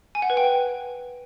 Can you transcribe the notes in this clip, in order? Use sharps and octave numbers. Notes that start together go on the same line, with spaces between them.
G#5
F#5
B4
G5
B4